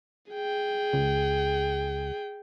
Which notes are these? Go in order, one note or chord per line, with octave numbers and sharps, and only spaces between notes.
G#4 G5
C#2